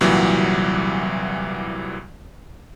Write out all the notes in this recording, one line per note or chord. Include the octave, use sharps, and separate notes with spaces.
C2 A#2 E3 F#3 G3